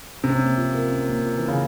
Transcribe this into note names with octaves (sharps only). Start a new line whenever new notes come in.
C3 C#4
A#3
F4
A#4
C#4
A#3
F4
E3
A#4
C#3